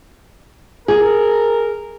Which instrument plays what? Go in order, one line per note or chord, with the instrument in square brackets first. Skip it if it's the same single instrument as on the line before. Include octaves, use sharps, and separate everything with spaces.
[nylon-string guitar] G#4 [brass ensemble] A#4